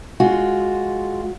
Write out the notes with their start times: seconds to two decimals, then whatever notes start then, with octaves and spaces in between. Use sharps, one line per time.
0.20 G#3 F4 F#4